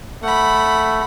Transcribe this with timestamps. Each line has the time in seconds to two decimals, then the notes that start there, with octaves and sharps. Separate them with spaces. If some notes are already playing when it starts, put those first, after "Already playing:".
0.24 A3 F#5 B5